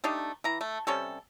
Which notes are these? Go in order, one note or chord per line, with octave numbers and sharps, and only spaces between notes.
A3 D4 D#4 G4
E3 A#5
A3
C3 G3 C#4 A4